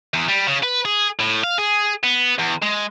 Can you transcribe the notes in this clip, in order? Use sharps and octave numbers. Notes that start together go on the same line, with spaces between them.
E2
G3
C#3
B4
G#4
A2
F5
G#4
B3
E2
G#3